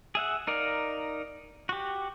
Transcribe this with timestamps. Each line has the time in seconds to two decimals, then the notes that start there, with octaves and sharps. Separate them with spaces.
0.15 G#4 E5 F#5
0.47 D#4 A#4 D5 F5
1.69 F#4 G4